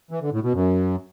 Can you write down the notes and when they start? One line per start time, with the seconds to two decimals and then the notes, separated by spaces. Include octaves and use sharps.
0.11 E3
0.22 D3
0.32 A2
0.43 B2
0.53 F#2